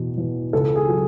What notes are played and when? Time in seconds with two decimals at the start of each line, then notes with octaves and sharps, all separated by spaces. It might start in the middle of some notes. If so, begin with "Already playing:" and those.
Already playing: E2 B2
0.18 E2
0.53 C#2 A4
0.76 G#4
0.88 F#3